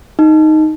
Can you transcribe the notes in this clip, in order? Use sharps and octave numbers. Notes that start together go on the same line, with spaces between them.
D#4